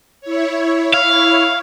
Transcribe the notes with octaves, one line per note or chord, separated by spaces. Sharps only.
E4 C#5
F5